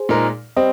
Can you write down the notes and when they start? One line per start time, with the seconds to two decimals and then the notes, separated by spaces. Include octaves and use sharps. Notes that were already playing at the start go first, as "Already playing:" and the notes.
Already playing: G#4 C5
0.09 A#2 G#3 D#4 A#4
0.57 G3 C4 C5 D#5